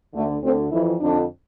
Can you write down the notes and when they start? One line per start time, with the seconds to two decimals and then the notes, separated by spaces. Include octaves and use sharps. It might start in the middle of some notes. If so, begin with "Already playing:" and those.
0.14 D2 D3 A3
0.43 D2 D3 C4
0.72 F2 E3 E4
1.01 F2 D3 D4